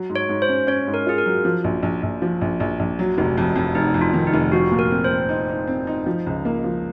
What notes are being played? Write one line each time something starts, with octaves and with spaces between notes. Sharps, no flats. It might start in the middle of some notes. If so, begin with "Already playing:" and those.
Already playing: F#3
G#2
C#5
G#2
C5
C#4
C#4 C#5
G#2
A#4
F4 G#4
A#4
F#3
F3
A#1
A#1
A#1
F3
A#1
A#1
A#1
F#3
F1
F2
F2
F1 D#4
F2
F4
D#3
D#4
F1
F3 F#4
A#2
A#4
C4
C5
C4
D#4
D#4
C4
D#4
F3
C#2
A#3
F3